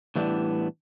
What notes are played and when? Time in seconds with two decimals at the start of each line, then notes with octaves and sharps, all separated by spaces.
0.16 A2 E3 G3 B3 D4